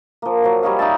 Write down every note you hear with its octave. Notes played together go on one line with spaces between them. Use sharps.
F3 A#3
F3 F#3
G3 C#5 D#5 F5
D#4 E5 A5